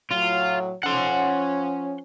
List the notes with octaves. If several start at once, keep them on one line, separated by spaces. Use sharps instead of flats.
A2 F#3 F4
F3 C#4 F#5 C6